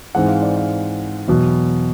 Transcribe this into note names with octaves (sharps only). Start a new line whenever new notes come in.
G#2 E3 G#3 C4 F#5
F5
D5
F5
E2 B2 F#3